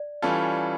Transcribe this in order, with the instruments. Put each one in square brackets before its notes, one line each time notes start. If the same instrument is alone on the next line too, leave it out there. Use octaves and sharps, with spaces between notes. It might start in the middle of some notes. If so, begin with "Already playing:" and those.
Already playing: [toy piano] D5
[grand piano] E3 G3 C#4 F4 A4